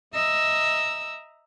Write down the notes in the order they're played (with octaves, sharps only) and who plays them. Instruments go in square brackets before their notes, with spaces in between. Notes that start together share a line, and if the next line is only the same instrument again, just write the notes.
[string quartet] D#5 E5 A#5 E6